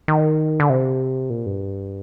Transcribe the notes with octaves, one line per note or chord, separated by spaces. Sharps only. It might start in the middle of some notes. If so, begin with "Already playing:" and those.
D#3
D3
C3
A#2
G2